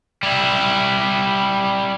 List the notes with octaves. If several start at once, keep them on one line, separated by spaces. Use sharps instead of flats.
G3 E4